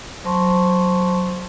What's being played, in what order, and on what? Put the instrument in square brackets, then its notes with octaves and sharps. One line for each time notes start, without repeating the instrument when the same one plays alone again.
[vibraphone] F#3 C5 A5 C6 C#6